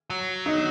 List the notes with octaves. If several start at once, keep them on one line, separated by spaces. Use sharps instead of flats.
F#3
D#4